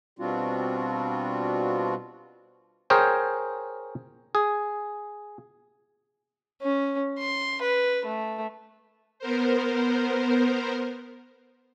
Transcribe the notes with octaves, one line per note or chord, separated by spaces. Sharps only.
B2 G3 C4 D4 F4 F#4
G#4 A#4 C5 C#5 G5
G#4
C#4
C6
B4
A3
B3 A#4 C5